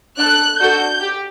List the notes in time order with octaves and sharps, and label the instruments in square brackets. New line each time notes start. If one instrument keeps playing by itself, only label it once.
[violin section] D4 A4 F#6
D4 F#4 A4 G6
G4